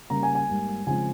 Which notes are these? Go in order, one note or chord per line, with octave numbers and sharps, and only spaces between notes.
C#3 G3 A#3 C#4 A#5
G#5
G#5
G#2 G3 A#3
C#3 F3 G#3 C4 G#5